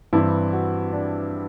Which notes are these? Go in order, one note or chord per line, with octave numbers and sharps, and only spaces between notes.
G2 E3 G3 C4 E4
F#4
D4